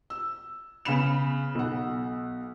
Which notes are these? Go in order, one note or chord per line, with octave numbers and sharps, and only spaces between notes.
E6
C#3 B3 B5 E7
B1 F#5